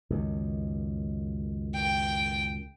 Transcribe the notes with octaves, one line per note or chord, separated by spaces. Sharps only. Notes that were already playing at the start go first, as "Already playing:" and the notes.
C#2 F#2 D#3
G5